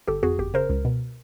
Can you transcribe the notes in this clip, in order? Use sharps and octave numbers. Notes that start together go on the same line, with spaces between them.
G1 G4 A4
F2 F#4 G#4
G1 G4
C#3 A#4 C5
C#2
B2